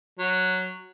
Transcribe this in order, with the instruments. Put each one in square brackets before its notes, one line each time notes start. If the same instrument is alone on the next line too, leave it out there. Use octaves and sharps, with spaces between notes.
[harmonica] F#3